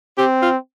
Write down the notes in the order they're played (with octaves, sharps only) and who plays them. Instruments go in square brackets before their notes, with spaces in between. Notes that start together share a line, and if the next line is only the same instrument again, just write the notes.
[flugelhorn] C4 [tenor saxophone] G4
[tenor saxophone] F4